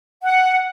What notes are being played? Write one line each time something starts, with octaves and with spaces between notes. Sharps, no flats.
F#5